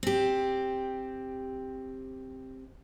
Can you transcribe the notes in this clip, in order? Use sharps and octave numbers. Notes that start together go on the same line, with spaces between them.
C4 G4